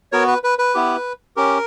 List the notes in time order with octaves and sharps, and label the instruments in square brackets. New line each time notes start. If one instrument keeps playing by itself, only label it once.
[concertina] B3 F#4 A#4 C#5
B4
B4
B4
B3 E4 G4
C#4 G4 A#4